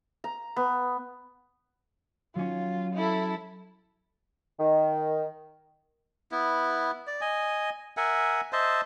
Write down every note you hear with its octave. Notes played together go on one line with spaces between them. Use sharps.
A#5
B3
F#3 C#4 F4
E4 A4
D#3
B3 E4
D5
D#5 G#5
A#4 E5 F#5 G#5
C5 D#5 E5 A5